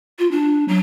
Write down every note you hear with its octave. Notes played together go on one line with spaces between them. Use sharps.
F4
D4
F#3